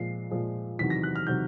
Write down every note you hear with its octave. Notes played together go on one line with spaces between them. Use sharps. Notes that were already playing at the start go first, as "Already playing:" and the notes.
Already playing: A#2 F3 G#3 C7
A#2 F3 G#3
E2 C3 D#3 F#3 B6
A#6
F#6
F6
C3 D#3 F#3 G6